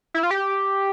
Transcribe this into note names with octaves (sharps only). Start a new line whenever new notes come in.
E4
F4
G4